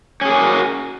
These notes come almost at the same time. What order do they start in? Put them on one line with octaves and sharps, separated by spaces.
C#4 G#4 A#3 F#4